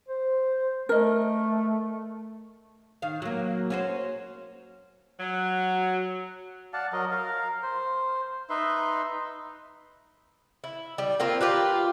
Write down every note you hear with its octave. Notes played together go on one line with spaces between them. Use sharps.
C5
A3 A#4 D#5
D#3 F5
F#3 A#3
C#4 F#4 C5
F#3
D5 F5 F#5 A5
F#3 A#4 D#5
A#4 F5
C5
D#4 B4 E5 C6
E4
G3
A#3 C4 F4
F4 G4 B4